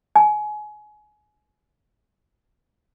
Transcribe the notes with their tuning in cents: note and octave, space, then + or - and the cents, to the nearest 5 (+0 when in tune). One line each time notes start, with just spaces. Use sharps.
G#5 +25